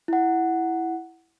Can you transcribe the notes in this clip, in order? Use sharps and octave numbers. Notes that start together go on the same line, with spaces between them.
E4 F#5